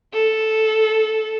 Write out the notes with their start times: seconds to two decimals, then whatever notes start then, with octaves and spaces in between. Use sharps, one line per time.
0.13 A4